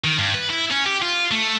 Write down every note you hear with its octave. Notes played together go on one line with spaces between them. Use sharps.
D#3
G2
B4
E4
C#4
G4
F4
A3